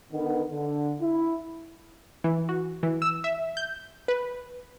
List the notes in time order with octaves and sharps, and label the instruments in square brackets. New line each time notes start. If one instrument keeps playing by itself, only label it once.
[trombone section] D3 D#3 B3
D3
E4
[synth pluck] E3
F#4
E3
E6
E5
G6
B4